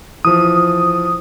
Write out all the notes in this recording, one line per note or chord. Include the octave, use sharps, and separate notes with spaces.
E3 F3 D#6